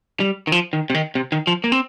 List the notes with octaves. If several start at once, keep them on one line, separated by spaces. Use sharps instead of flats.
G3
D#3
F3
D#3
C3
D#3
C3
D#3
F3
A#3
C4